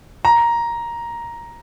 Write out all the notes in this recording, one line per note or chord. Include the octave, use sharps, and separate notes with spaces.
A#5